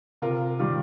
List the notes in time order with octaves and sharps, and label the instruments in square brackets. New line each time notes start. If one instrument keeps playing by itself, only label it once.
[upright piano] C3 F4 A#4
D#3 G3 F4